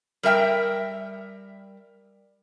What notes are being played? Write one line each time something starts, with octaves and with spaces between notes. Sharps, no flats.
G3 A#4 E5 G5